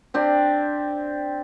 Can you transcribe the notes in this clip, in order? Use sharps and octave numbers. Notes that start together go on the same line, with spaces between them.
C4 D4 G4